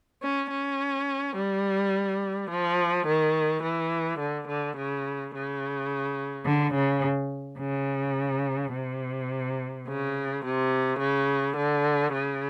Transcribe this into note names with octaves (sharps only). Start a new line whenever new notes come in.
C#4
C#4
G3
F3
D#3
E3
D3
D3
C#3
C#3
D3
C#3
C#3
C3
C#3
C3
C#3
D3
C#3